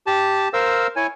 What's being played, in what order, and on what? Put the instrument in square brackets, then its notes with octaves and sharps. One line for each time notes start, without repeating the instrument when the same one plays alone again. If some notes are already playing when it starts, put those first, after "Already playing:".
[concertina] G4 A5
A#4 C5 F5 E6
E4 C#5 G#5